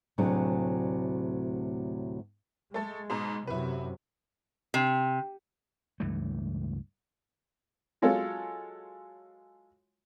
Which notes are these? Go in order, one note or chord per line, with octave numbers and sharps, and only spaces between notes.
D2 A2 C3 F#3 D4 G#4
G#3 A3 A4
G#2 B2 A#5
F#2 C3 E4 B4
C3
C#2 G2 E3 A3
F#3 G#3 F4 A4 C#5 F5